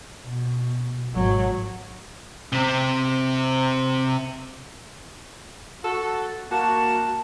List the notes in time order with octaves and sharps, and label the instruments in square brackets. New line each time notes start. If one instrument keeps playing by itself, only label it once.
[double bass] B2
G#1 F#3
[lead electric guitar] C3 C4
[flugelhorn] F#4 [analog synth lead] A4
[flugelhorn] A#3 [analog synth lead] F#4 [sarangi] A5